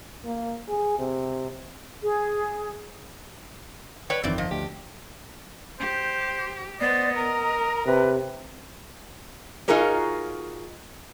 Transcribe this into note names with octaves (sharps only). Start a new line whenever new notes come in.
A#3
G#4
C3
G#4
B4 C#5 D5 G5
G1 F2 D#3 E3 C4 D5
F3 D#5
D2 G4
G4 C5
B3 C5 D5 D#5
A#4 A#5
C3 B4
D#4 F4 F#4 G#4 A#4 C#5